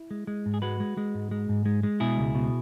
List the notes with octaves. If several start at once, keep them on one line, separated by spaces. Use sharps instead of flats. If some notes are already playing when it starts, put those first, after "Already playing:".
Already playing: E4
G#3
G#3
G#2
G#4
G#3 F#4 B4
G#3
G#3
G#2
G#3
G#2
G#3
G#3
B2 E4 G#4
C#2
B2